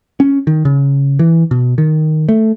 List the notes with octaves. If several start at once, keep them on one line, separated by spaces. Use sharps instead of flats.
C#4
D#3
C#3
E3
B2
D#3
A3